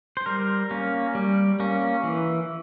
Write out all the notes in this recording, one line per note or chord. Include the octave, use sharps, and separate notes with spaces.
C5
G3 A#4
A#3 C#4
G3
A#3 C#4
E3